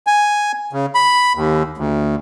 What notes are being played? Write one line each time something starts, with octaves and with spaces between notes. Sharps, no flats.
G#5
C#3
B5
D#2
D2